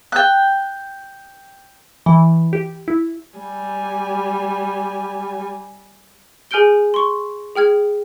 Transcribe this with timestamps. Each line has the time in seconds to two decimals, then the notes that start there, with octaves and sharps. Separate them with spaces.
0.12 G5 F#6
2.06 E3
2.53 G4
2.88 E4
3.38 G3 G#5
6.51 G#4 G#5 F6 G6 D7 G7
6.94 C6 C#6
7.56 G#4 G5 F6 G#6